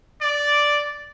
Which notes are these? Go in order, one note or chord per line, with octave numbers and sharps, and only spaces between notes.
D5